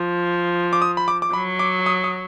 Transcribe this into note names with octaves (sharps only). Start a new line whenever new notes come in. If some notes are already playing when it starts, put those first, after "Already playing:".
Already playing: F3
D6
D#6
B5
D6
D6
F#3 B5
D6
D#6
D#6